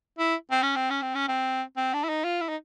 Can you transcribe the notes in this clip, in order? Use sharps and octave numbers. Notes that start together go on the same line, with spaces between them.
E4
C4
C#4
C4
C#4
C4
C#4
C4
C4
D4
E4
D#4
F4
E4
D#4